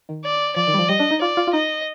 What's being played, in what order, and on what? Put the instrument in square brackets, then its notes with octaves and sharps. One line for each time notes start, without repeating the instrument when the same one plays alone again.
[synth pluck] D#3
[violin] D5
[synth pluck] F3 [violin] D5
[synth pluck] D#3
G3
F3
[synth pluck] G3 [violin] D#5
[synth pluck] D4
D#4
[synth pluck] F4 [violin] D5
[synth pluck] F4
F4
[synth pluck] D#4 [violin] D#5